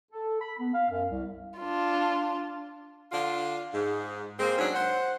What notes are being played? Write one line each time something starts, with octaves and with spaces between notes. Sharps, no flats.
A4
B5
B3
F5
F#2
C2
D4 F4
D3 D4 F4
G#2
G#3 A#3 C4
G#2 F#3 C#4 D4
C5 F#5